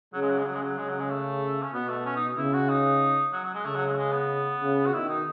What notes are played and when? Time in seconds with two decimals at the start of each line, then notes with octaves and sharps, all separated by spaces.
0.14 C#3 F#3
0.22 G#3
0.30 F#3
0.38 G#3
0.45 C#3 F#3
0.54 G#3
0.62 F#3
0.77 C#3 G#3
0.88 F#3
1.00 G#3
1.10 A3
1.62 C#4
1.73 B2 B3
1.89 A3
2.05 C#4
2.16 D#4
2.37 C#3 E4
2.53 F#4
2.69 D#4
3.33 F#3
3.44 F#3
3.54 G#3
3.65 C#3 A3
3.75 F#3
3.86 G#3
3.93 A3
3.97 G#3
4.13 B3
4.61 C#3
4.86 F#4
4.93 B2 D#3 E4
5.09 D#4